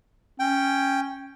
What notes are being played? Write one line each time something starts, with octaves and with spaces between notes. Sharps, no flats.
C#4 G5